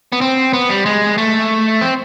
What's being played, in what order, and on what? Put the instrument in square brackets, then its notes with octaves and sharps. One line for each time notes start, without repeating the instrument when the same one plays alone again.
[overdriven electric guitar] B3
C4
B3
G3
G#3
A3
C4